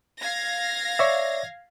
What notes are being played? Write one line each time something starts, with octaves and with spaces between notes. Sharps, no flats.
F5 G#6 A#6
C#5 D5 E5